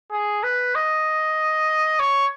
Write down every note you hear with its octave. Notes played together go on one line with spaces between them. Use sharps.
G#4
B4
D#5
C#5